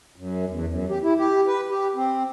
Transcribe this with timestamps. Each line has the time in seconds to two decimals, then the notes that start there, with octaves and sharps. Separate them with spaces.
0.16 F#2
0.49 E2
0.69 F#2
0.89 G4
1.02 E4
1.17 G4
1.47 B4
1.69 G4
1.95 C4